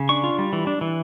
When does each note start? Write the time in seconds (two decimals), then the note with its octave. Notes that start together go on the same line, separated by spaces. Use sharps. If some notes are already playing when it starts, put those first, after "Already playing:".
Already playing: C#3
0.09 D4 C#6
0.24 F4
0.39 G3
0.53 E3
0.67 D4
0.81 E3